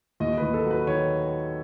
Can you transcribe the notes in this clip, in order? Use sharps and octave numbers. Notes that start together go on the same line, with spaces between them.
D#2 D#5
D#2 B4
A4
F#3
B4
D#3 C#5